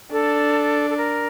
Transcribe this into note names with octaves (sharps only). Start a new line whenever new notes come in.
D4 A4
A4
A#4